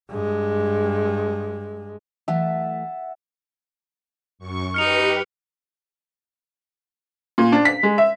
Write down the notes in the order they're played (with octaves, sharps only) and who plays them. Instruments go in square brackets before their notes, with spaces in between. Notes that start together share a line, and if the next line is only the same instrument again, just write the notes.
[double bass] G2 G#3
[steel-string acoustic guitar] E3 F#3 A3 [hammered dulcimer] E5 F#5 A5
[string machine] F#2 C#6
[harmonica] D#4 [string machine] G4 B4 [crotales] F6 C#7 F7
[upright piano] A#2
D4
B6
G#3
E5